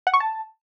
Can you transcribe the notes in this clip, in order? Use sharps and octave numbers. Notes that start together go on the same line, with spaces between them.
F#5
C#6
A5